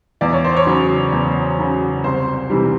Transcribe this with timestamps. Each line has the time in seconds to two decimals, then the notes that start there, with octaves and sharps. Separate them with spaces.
0.21 E2 D5
0.33 C#5
0.44 C5
0.56 C#5
0.66 C#3 F#3
1.12 E2
1.58 C#3 F#3
2.04 C2 C5
2.50 C3 E3 G3